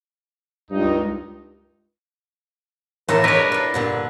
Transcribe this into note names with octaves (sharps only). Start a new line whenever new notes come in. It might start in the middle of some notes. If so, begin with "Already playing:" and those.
C#2 G2 D#3 D#4
A2 E3 A#4 A5
G#3 D4 A#4 B4 C#5
A2 A4
G2 A#2 D3